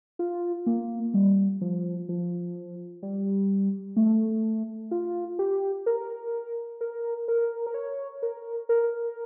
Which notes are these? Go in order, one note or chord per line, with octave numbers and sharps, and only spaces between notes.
F4
A#3
G3
F3
F3
G3
A3
F4
G4
A#4
A#4
A#4
A#4
C#5
A#4
A#4